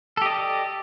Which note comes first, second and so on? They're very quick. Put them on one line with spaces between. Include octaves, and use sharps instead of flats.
A4 G4 D#5 D5